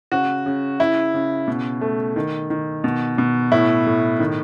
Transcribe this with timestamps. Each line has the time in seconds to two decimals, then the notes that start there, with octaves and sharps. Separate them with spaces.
0.11 C#3 F#4
0.46 C#3
0.79 C#3 E4
1.14 C#3
1.48 B2
1.81 A3
2.16 D#3
2.50 D#3
2.84 B2
3.18 B2
3.52 A2 E4
3.86 A2
4.20 D#3